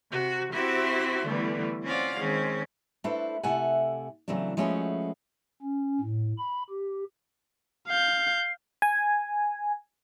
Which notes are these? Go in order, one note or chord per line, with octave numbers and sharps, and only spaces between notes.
C3 F#4
C4 E4 F#4 G4 E5 C6
D3 E3 G3 A3 B3
C4 C#4 F4 D5 F5 F#5
D#3 G#3 C4 C#4
A3 D4 E4 A4 B4 C5
C3 A3 E4 A4 F#5 G#5
C#3 E3 F#3 A3 C4 D4
F3 G#3 A3 C#4 F#4 B4
C#4
A2
B5
G4
F5 G6 C7
G#5